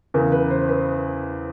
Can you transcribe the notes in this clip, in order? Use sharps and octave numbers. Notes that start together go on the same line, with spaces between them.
E2 C#3 E3 A#4
B4
C5
B4